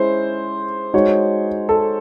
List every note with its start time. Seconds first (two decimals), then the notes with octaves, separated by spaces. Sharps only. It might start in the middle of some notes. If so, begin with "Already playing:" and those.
Already playing: G#3 C#4 E4 G#4 C5
0.94 G#3 D#4 F#4 C#5
1.69 A4